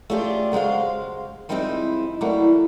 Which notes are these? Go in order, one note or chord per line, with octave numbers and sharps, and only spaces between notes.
A3 C#4 D4 F4 G4 G#4
C#3 F#3 G#3 C5 F5
F3 G3 G#3 C4 D#4 E4
E3 F#3 G3 A3 A#3 E4